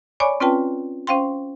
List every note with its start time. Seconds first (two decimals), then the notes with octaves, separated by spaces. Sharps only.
0.20 C#5 D5 G#5 B5 C#6 D6
0.40 C4 C#4 F4 B4 G5 A5
1.07 C#4 C5 F5 G5 C6